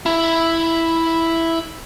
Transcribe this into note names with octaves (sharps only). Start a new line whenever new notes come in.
E4